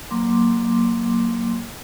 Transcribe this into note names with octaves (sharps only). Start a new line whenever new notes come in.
F#3 A#3 C6 D6